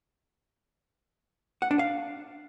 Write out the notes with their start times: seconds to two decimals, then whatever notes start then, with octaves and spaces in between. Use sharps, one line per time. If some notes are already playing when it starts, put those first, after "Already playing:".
1.62 F#5
1.71 D4
1.79 F5